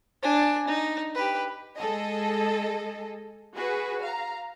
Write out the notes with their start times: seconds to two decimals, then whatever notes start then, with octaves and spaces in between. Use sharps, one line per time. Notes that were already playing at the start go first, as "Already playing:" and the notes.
0.23 D4 G#5
0.68 D#4
1.15 G4 B4
1.76 G#3 G#4 A4 D#5
3.55 F#4 G#4 B4
4.03 F5 A#5